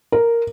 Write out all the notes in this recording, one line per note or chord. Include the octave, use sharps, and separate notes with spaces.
A#4